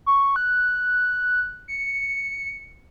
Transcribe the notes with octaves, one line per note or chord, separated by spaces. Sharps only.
C#6
F#6
C#7